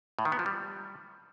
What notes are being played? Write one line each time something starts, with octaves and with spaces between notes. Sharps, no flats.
A2
D#3
B3
F3
G3